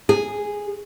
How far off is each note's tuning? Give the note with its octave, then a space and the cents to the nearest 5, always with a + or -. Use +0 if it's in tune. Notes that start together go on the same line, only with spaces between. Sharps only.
G#4 -5